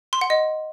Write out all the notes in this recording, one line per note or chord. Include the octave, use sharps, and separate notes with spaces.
C6
F#5
D#5